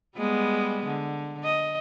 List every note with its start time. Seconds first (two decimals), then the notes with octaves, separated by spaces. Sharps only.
0.16 G3 G#3 B3
0.86 D3
1.44 D#5